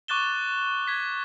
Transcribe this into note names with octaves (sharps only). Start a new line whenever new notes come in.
C#6 D6 F#6 A6 E7 G7
G#6 B6